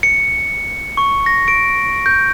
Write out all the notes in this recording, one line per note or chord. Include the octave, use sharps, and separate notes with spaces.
C#7
C#6
A#6
D7
G6